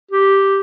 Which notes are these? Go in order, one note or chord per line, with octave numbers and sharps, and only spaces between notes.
G4